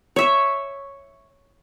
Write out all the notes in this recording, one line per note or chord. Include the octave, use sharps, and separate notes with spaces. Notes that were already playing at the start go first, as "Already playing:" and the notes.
C#5 E5